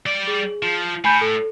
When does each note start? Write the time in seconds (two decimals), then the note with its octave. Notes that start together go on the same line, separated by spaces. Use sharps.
0.06 G3 D5
0.27 G#4
0.62 F3
1.04 A2 G#5 B5 G6
1.21 A4